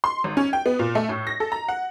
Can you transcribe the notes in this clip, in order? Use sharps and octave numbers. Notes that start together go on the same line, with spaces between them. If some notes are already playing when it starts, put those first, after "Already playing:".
C6
G#1
C#4
G5
B3
A#2
A3
A2
A#6
A4
A#5
F#5